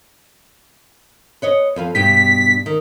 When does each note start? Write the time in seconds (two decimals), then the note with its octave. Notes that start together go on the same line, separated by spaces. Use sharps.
1.42 B4 C#5 D#5
1.76 F2 B4 F5
1.95 G2 B2 G4 B6
2.66 D#3